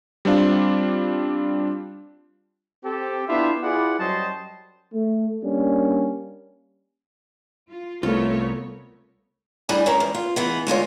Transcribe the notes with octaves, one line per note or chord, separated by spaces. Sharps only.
G3 C4 D4 F4
C4 G4 A4
B3 D4 E4 F4 G4 E5
E4 F4 G#4 B4 D5 F#5
F#2 F#3 G3 C5 D#5 A5
A3
G3 A#3 C#4 D4
F4
C2 A3 B3 F4 A#4 C#5
A2 G3 D4 G#4 G#5
G#3 C#4 A#4
E2
F4
E3 G#3 B3
D2 G#3 F4 C#5